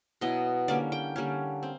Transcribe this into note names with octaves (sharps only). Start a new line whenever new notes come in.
B2 F#3 B3 E4 D#5
D3 G3 A#3 C#4 D5
G5
D3 G3 A#3 C#4
C4